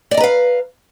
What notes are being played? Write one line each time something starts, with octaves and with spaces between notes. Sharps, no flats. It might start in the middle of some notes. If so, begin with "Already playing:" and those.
B4 D5 D#5 F5 A#5